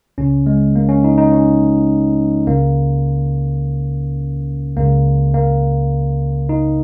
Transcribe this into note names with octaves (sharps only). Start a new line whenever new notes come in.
C#2 C#3 C#4
G#3
A#3
C#4
D#4
D#4
C#4
C#2 C#3 A#3
C#2 C#3 A#3
A#3
D#4